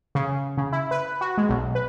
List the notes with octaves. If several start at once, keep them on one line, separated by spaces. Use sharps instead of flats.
C#3
C#3
E4
B4
F#4
G#3
B1
B4